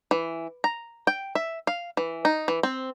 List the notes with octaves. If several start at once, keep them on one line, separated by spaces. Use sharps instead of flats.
E3
A#5
G5
E5
F5
E3
D#4
E3
C4